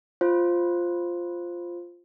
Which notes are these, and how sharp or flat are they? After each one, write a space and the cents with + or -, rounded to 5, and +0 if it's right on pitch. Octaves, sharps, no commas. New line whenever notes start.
F4 +0 C5 +0